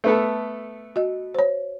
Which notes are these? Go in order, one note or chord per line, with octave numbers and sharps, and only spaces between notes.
A3 B3 A4
F#4 D#5
C5 C#5